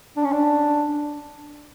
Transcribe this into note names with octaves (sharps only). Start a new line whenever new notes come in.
D4
C#4
D4